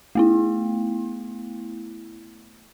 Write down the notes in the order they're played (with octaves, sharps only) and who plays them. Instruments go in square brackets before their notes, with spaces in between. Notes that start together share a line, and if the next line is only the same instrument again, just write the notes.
[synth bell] A3 B3 E4